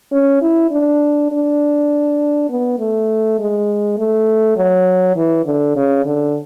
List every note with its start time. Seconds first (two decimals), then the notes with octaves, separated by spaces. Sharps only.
0.12 C#4
0.42 E4
0.71 D4
1.32 D4
2.50 B3
2.79 A3
3.39 G#3
3.98 A3
4.57 F#3
5.17 E3
5.46 D3
5.76 C#3
6.06 D3